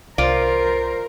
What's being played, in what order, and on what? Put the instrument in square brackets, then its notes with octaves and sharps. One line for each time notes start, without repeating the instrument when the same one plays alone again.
[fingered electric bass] C2 [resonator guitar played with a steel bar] F4 D5 [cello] A#4 [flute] C5